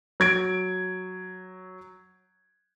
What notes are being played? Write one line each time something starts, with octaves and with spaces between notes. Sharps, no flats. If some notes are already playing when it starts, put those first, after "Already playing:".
F#3 G#6 D7